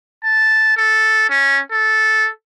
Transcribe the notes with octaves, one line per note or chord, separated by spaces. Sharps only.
A5
A4
C#4
A4